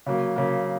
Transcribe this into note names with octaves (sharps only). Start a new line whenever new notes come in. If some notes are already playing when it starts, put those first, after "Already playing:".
C#3 F#3 A#3
C#3 F#3 A#3